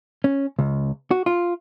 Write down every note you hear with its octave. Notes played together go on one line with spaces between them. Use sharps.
C#4
C#2
F#4
F4